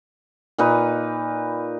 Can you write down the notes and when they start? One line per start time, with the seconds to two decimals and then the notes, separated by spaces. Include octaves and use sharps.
0.58 A#2 D#4 B4